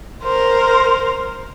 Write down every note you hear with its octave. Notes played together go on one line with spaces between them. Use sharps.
A#4 C5